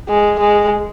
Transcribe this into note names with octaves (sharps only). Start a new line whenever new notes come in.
G#3
G#3